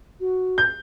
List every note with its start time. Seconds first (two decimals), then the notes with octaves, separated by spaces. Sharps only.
0.20 F#4
0.58 G6